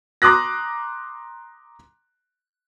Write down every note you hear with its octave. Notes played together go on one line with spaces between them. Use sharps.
A#5 C6 D6 D#6 F#6 A#6